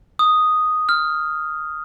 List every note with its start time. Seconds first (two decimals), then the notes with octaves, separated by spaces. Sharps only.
0.19 D#6
0.89 F6